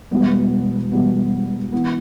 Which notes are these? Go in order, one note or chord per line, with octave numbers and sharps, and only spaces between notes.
E1 E2 B2 G3 B3
E1 E2 B2 G3 B3
E3 B3